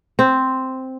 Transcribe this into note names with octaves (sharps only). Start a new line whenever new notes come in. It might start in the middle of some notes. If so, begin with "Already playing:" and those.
C4